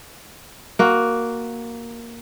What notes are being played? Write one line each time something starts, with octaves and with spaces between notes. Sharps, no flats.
A#3 F#4